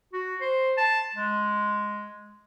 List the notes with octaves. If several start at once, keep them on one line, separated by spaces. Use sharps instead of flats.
F#4
C5
A5
G#3